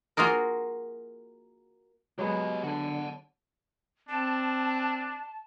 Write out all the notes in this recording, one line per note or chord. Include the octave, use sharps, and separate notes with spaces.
A#3 F4 F#4 G#4 A#4
F#3 G#3 B3 G4 D#5
D3 F#5 A5
C4 D4 A5